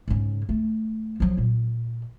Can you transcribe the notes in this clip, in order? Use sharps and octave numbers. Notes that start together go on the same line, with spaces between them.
G#2 C#3
A3
F3 F#3
A#2